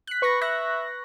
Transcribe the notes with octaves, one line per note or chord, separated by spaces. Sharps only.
F#6 B6
B4 B5 C#6 A#6
E5 C#6 F#6 A#6